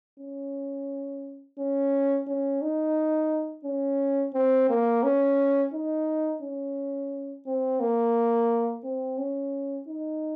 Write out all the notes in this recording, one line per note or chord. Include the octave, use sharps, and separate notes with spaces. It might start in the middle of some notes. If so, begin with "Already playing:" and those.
C#4
C#4
C#4
D#4
C#4
C4
A#3
C#4
D#4
C#4
C4
A#3
C4
C#4
D#4